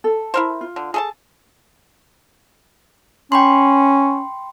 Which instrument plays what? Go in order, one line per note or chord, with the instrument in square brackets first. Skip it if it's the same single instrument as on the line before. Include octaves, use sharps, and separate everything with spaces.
[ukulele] A4
[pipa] E4 A#4 C5
[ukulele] F4
[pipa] D3
G#4 A4 A5
[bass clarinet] C#4 [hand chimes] G5 B5 C6